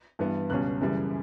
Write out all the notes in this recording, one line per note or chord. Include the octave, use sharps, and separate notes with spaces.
G2 E3 G3 B3
C#2 B2 G3 C#4 F#6
F#1 F#2 C#3 E3 G3